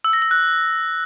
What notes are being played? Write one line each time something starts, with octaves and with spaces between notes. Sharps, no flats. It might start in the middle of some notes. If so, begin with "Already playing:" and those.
E6
A#6
E6
F#6